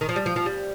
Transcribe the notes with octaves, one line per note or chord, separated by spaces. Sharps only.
D#3
F3
G3
F3
F3
G3